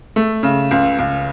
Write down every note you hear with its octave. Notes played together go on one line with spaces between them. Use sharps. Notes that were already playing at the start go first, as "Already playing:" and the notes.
A3
C#3
C#2
C#2